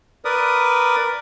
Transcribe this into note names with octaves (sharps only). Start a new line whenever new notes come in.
A#4 B4 D5 D#6